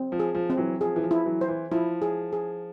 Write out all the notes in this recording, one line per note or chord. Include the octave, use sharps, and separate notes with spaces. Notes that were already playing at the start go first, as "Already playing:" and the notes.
Already playing: C4
F3
G#4
F3
C4
E3 F#3
F3 G#4
E3
F3
E4
E3 F#3
C5
E3
F3 E4
G#4
G#4